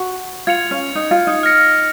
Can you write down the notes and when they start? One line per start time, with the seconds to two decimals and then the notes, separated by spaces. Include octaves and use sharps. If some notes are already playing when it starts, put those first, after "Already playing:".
Already playing: F#4
0.47 F4 G#6 C#7 F7
0.71 C#4
0.95 D#4
1.11 F4
1.27 D#4
1.43 F6 A#6 C#7